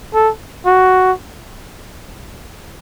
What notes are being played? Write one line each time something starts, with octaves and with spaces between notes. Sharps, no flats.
A4
F#4